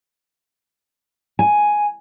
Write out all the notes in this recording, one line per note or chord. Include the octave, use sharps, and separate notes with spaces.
G#5